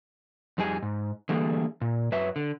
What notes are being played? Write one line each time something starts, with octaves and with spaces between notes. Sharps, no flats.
F2 G3 D#4 G#4 G#5
G#2
D3 E3 G3 A3 A#3 G#4
A#2
F#2 F#3 B4 E5
D3